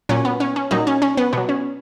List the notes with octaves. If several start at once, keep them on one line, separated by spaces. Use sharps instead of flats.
A#2 F#3 C#4
B3
C#4
C#4
A#2 F#3 D#4
C#4
C#4
B3
B2 F#3 B3
C#4